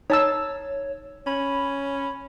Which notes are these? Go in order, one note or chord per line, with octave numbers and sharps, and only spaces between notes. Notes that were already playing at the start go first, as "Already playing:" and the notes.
D#4 C#5 A5 E6
C#4 B5